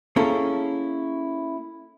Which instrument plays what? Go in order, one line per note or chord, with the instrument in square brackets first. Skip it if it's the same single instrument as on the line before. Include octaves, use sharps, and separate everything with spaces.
[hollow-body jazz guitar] A#3 C#4 E4 G#4 A4